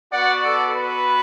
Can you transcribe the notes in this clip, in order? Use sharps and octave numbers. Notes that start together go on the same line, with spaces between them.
B3 F#4 D5 F#5
A4 D5
B4